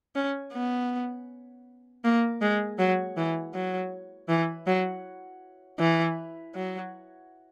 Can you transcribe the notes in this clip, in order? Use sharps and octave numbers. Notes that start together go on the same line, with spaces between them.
C#4
B3
A#3
G#3
F#3
E3
F#3
E3
F#3
E3
F#3